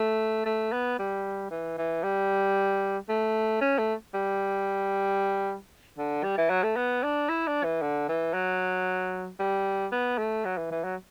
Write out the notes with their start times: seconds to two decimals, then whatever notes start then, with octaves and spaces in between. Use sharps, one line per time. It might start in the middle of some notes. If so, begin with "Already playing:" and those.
Already playing: A3
0.45 A3
0.73 B3
0.99 G3
1.51 E3
1.78 E3
2.03 G3
3.09 A3
3.61 C#4
3.78 A3
4.14 G3
5.98 D3
6.23 G3
6.38 E3
6.50 F#3
6.63 A3
6.76 B3
7.03 D4
7.29 E4
7.47 D4
7.64 E3
7.82 D3
8.08 E3
8.34 F#3
9.39 G3
9.92 B3
10.18 A3
10.45 F#3
10.57 E3
10.71 E3
10.84 F#3